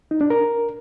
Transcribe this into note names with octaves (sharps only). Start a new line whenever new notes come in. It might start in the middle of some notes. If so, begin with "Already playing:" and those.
D#4
D4
A#4